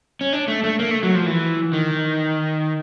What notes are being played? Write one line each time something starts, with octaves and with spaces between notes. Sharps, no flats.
C#4
D4
A3
A3
A#3
A3
F#3
F3
E3
D#3